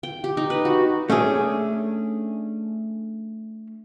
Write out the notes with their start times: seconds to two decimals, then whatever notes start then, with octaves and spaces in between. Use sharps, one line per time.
0.03 G5
0.24 G4
0.37 D#4
0.50 B4
0.65 F#4
1.10 A3 C#4 D4 G#4